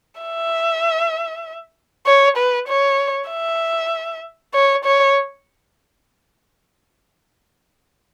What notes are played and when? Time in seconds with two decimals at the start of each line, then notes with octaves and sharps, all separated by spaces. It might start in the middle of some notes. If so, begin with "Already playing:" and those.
0.21 E5
2.06 C#5
2.37 B4
2.68 C#5
3.30 E5
4.54 C#5
4.84 C#5